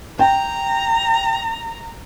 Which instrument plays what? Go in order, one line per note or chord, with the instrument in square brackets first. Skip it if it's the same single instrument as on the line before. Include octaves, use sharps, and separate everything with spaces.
[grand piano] G5 [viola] A#5